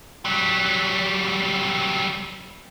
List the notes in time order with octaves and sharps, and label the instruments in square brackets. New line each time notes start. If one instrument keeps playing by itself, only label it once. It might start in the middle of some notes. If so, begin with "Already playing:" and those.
[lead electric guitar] F#3 G3